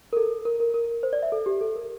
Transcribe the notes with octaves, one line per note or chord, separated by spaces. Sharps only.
A#4
A4
A#4
A#4
A#4
C5
D5
E5
A4
G4
A4
A#4